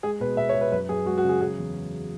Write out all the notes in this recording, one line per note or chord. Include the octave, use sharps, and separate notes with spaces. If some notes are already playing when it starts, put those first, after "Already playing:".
G#3 G#4
B2 B4
B2 E5
C#5
G#3
B4
F#2 B4
F#2 G#4
G#3 F#4
F#4
C#3
G#4
F#3 G#4
E2